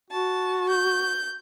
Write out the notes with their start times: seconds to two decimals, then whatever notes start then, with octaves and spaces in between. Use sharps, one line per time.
0.10 F#4 A5
0.69 G6